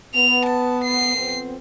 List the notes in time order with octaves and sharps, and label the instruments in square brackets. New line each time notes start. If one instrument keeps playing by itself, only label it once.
[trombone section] B3 [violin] F7
[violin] A5
C7
[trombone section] F2 B3 C4